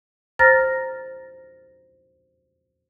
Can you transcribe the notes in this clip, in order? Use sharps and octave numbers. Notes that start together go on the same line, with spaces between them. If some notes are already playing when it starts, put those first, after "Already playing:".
C5 A#5 F6 A6 A#6